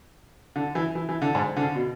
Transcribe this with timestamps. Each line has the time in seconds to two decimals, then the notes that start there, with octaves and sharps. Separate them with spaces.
0.56 D3
0.75 E3
0.95 E3
1.09 E3
1.22 D3
1.35 G#2
1.57 D3
1.62 C#3
1.75 B2